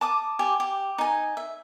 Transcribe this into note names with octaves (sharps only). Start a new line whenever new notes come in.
A5 D6 D#6
G4 G#5
G4
D#4 G#5
E5